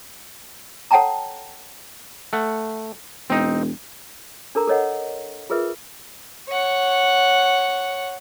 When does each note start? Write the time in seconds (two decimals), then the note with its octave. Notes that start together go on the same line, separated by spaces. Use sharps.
0.91 A4 C#5 F#5 G5 A5 A#5
2.33 A3 F#5
3.30 E1 C4 D#4
4.55 D4 A4 A#4 A#5
4.67 A4 A#4 C#5 D#5 F#5
5.50 F4 G#4 A#4 B4 E5
6.49 C#5 F#5